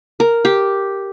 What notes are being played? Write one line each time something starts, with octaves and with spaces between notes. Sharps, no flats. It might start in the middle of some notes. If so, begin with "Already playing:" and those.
A#4
G4